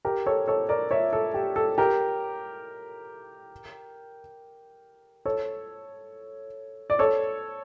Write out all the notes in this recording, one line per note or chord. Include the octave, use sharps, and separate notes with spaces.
G4 A#4
A4 C#5
A4 C#5
A#4 D5
C#5 E5
A4
G4
A4
G4 A#4
A4 C#5
D5
A4 C#5